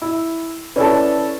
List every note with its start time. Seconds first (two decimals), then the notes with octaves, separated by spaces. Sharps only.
0.02 E4
0.76 C#4 E4 A4 B4 D5